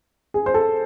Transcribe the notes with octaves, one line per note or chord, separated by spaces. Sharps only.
G#4
C5
A4